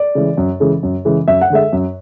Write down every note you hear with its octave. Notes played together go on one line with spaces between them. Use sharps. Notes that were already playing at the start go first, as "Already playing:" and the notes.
Already playing: D5
C#3 E3 G#3
F#2
C#3 E3 G#3
F#2
C#3 E3 G#3
F#2 E5
F#5
D3 G#3 E5
F#2